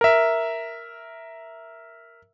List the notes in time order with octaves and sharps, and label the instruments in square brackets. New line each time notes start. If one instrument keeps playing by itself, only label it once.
[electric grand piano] A#4 E5